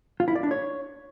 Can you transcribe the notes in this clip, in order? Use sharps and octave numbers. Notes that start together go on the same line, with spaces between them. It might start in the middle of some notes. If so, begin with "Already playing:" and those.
F4
E4
D5
D4
C#5